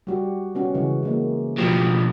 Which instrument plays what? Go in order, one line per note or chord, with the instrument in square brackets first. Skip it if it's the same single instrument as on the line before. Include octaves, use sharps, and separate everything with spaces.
[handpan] G3 F#4 G4
B3 C#4 F#4
C#3 E3 G#3
E3 G#3 A#3
[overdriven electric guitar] B2 F3 [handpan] G4 B4